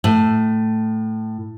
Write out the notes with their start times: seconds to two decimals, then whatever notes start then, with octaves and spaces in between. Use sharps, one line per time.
0.04 A2